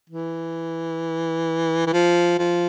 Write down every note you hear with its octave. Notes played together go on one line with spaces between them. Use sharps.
E3
E3
F3
F3